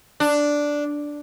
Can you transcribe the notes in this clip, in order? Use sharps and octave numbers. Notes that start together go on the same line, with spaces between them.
D4